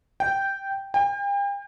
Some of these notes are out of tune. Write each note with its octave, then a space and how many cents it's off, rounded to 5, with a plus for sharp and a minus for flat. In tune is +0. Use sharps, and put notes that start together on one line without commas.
G5 -5
G5 +40